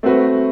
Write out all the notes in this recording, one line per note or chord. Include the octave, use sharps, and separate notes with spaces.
A3 C4 F#4 B4